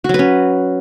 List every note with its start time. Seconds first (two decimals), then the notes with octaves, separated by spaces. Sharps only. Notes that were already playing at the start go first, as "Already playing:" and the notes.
0.04 F#4
0.09 F#3
0.14 B4
0.19 C#4